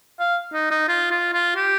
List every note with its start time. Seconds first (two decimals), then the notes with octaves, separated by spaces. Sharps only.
0.19 F5
0.53 D#4
0.71 D#4
0.88 F4
1.11 F4
1.33 F4
1.56 G4